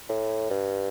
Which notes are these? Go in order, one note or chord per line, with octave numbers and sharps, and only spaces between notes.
A2
G2